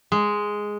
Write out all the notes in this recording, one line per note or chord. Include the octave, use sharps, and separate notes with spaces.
G#3